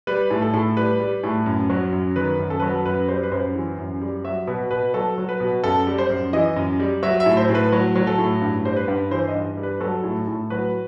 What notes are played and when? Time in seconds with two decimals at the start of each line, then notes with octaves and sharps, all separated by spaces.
0.07 G3 B4
0.30 A2
0.42 A4
0.54 A2
0.77 G3 B4
1.00 G3
1.23 A2
1.46 F#2
1.70 F#3
1.93 F#2
2.16 D#3 B4
2.39 F#2
2.50 A4
2.60 F#3 B4
2.69 A4
2.85 F#2 B4
3.08 G3 C5
3.23 B4
3.32 F#2 C5
3.55 E3
3.78 F#2
4.01 G3
4.24 F#3 E5
4.47 B2 B4
4.71 B2 B4
4.94 F#3 A4
5.18 F#3
5.29 B4
5.40 B2
5.64 F#2 A4
5.87 G3
5.98 C5
6.10 F#2
6.33 E3 D#5
6.56 F#2
6.80 G3
7.03 F#3 E5
7.20 E5
7.26 A2
7.37 C5
7.49 A2
7.55 B4
7.72 F#3
7.96 F#3
8.07 A4
8.18 A2
8.42 G2
8.65 G3 C5
8.77 B4
8.88 G2
9.11 E3 C5
9.28 D#5
9.35 G2
9.58 G3
9.63 B4
9.80 F#3 A4
10.04 A2
10.27 A2
10.50 F#3 B4